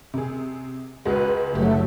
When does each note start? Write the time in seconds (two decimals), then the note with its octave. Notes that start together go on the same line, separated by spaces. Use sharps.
0.14 C3 G#4
1.05 C#2 G#3 F#4 B4
1.55 F#1 F#3 A3 G4